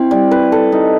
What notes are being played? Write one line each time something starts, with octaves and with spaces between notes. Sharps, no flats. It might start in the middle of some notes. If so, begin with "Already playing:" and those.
Already playing: C4 E4
G3
B4
A4
D#4